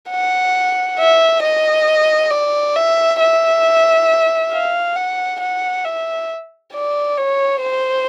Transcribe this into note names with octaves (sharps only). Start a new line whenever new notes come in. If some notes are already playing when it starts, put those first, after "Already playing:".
F#5
E5
D#5
D5
E5
E5
F5
F#5
F#5
E5
D5
C#5
C5